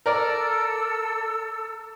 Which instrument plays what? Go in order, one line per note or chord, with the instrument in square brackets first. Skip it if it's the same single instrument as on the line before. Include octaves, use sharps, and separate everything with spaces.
[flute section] A4 E6 [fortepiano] A#4 D5